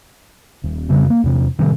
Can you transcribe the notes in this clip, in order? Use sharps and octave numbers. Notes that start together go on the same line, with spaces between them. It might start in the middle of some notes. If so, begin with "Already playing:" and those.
D#1
F2 C#3 G3
A#3
E2 C3
A2 C3 D#3 G3